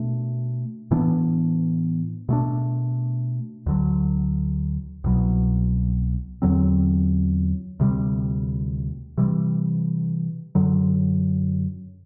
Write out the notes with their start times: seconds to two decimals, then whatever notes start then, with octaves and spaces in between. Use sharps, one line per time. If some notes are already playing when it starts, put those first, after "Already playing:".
Already playing: B2 A3 D4
0.91 A2 E3 B3 D4
2.29 B2 A3 D4
3.66 D2 D3 F#3
5.04 C2 B2 F#3
6.42 E2 D3 F#3 C4
7.80 D2 C3 G3
9.18 C3 E3 G3
10.55 F#2 D3 F#3